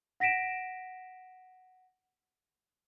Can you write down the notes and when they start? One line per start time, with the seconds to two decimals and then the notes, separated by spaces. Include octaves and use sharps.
0.20 F#5 A#6 B6 D7 E7